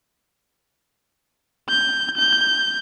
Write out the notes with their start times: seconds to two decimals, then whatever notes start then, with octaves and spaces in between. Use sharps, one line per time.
1.69 G6
2.17 G6